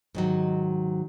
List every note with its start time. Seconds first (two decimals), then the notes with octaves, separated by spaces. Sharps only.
0.15 G#2 D#3 F#3